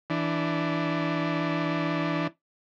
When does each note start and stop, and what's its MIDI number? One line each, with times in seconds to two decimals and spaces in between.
0.10 2.27 52
0.10 2.27 62